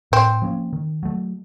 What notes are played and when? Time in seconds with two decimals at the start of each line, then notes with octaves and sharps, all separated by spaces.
0.12 A2 C4
0.42 F3 A#3 C#4
0.73 D#3
1.03 F#3 A3